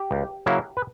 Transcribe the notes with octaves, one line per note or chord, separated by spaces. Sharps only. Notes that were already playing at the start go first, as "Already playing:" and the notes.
Already playing: G4
C#2
C#3 F#3 A#3 E4
B4